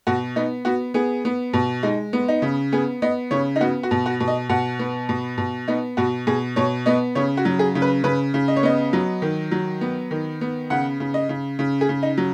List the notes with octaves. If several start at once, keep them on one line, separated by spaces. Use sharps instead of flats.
B2 F#4
B3 D#4
B3 F#4
B3 G#4
B3
B2
G#3 D#4
B3
D#4
C#3
B3 G#4
B3 D#5
C#3 C#5
D#4
B3 F#4
F#4
B2
F#4
B2
D#5
B2 F#5
B3
B2
B2
B3 D#4
B2 F#4
B2 G#4
B2 C#5
B3 D#5
C#3 C#5
F#4
F#3
G#4
C#3
B4
C#3 B4
C#3
D#5
C#5
B3 D#5
F#3
D#3
F#3
B3
D#3
B3
C#3 F#5
C#3
D#5
C#3
C#3
G#4
C#3
D#4
F#3